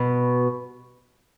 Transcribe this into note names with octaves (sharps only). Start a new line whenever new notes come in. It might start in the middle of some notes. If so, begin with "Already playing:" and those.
Already playing: B2